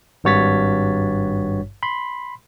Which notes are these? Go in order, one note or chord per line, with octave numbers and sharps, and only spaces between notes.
G#1 G2 F#4 C#5 A6 B6
B5 C6